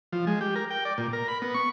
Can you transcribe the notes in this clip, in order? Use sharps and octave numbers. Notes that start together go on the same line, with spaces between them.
F3
G#3
G4
A#4
G5
D5
A#2
A#4
B5
B3
C#6